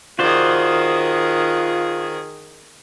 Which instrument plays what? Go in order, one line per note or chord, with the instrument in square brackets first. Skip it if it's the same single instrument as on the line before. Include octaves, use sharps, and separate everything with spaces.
[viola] D#3 G#4 [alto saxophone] F4 [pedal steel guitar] F#4 C5 D5